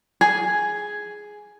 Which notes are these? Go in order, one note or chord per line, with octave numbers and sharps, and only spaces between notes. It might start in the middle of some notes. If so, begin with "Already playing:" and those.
G#4